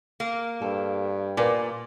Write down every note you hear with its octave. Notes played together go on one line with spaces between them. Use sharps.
A#3
G2 A4
A#2 A#4 B4 D5 G#5